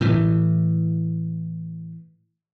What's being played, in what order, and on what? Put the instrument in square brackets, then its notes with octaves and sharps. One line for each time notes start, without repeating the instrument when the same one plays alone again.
[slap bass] A2 E3